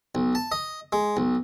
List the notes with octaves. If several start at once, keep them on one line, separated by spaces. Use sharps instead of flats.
B1
A5
D#5
G#3
B1